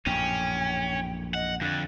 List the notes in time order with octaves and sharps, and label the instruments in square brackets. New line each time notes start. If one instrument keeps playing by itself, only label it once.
[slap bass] A#1 F#2 A2 [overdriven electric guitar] C#4 [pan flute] G5
[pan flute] D#5 [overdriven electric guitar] F#5
[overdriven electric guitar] F2 [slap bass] D3 [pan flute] F#6